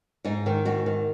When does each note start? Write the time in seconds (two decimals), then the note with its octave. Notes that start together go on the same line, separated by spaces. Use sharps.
0.24 G#2 D#4
0.46 D#3
0.65 G#2 F#4
0.86 D#3